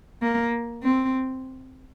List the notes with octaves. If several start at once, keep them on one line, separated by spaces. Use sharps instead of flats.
A#3
C4